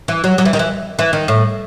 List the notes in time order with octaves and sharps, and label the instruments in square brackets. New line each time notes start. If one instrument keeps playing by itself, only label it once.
[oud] E3
F#3
F#3
E3
D#3
E3
E3
D#3
A2